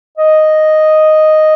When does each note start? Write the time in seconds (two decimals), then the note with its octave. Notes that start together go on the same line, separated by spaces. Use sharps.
0.17 D#5